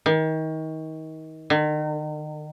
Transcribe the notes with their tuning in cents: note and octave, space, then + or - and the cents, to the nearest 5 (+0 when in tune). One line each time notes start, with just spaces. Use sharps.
D#3 +30
D#3 -40